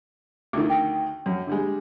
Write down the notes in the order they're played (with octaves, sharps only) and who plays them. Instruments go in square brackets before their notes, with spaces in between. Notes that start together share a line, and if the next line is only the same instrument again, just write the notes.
[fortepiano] D2 D#3 [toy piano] D6
[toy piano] G5
[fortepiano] F#2
D3 G3 G#3